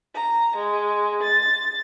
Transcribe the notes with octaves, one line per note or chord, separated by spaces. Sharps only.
A#5
G#3
A6